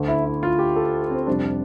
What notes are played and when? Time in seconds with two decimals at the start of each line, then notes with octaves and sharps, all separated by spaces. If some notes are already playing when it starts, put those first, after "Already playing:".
Already playing: D2 D3 A3
0.08 E4
0.25 E4
0.43 F4
0.59 G4
0.76 A4
1.10 C4
1.27 F2 C3 G3 D4